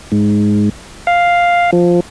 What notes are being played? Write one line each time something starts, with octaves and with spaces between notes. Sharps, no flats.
G#2
F5
F3